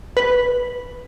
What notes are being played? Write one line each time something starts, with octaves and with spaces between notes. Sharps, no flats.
B4